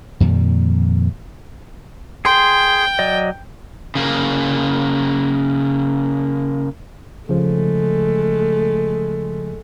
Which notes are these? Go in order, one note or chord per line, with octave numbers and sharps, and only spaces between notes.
F2 A#2 D#3 G3
G#4 G5 C6
F#3 D5 D#5
C#3 A#3
C#3 F3 G#3 A3